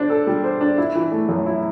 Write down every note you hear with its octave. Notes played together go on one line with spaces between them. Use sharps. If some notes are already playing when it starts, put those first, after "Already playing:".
Already playing: D4 C5
A4
G3
C5
D4
E4
E3
A3
F#2
E4